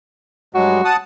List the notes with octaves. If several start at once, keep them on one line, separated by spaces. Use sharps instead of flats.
G2 F#3 G#3 F#4
F#5 A5 D#6